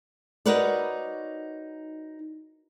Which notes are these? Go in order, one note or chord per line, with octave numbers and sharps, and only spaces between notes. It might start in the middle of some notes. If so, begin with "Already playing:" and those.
D#4 F#4 A#4 B4 C#5 D5